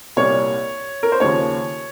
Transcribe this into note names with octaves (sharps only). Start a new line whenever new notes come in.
C2 A#2 G3 A#3 C#5
A#4
C5
D#2 C#3 F3 C#5